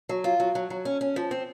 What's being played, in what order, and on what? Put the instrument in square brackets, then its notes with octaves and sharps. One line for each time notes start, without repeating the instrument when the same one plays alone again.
[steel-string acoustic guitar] F#3
F4
F#3
F#3
F#3
C#4
C#4
F3
C4